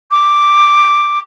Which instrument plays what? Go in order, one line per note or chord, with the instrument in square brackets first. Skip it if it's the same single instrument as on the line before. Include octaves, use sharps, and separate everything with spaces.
[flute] D6